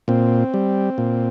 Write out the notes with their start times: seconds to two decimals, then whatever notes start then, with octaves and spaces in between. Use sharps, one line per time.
0.08 A#2 C4
0.54 G3
0.98 A#2